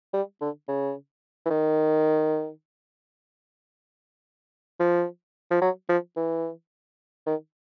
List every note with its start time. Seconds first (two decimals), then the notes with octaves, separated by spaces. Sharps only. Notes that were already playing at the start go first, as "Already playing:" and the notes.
0.13 G3
0.41 D3
0.68 C#3
1.45 E3
1.50 D#3
4.80 F3
5.51 F3
5.61 F#3
5.89 F3
6.16 E3
7.26 D#3